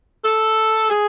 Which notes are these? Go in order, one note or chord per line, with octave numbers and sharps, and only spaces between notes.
A4
G#4